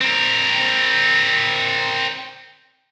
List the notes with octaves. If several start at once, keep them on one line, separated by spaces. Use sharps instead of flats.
C4 A#4